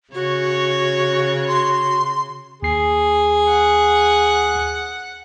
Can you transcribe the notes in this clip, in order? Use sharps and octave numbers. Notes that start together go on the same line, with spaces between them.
C#3 F#4 C#5
C6
D#2 G#4 C7
F#5